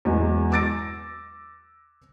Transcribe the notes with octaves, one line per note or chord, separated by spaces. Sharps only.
E2 F#3 G#3
D6 E6 A6 A#6 D7